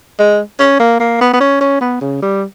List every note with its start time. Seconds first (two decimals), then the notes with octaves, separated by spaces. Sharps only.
0.19 G#3
0.59 C#4
0.79 A#3
1.00 A#3
1.21 B3
1.34 B3
1.40 C#4
1.61 C#4
1.81 B3
2.01 C#3
2.22 G3